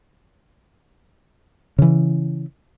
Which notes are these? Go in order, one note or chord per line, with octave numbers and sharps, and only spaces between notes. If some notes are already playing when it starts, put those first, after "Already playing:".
C#3 E3